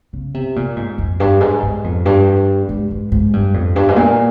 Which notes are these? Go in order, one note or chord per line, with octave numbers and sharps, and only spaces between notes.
C#3
C3
A#2
G#2
F2
G2
G#2
G#2
F2
G2
G#2
G#2
G#2
G2
F2
G2
G#2
A#2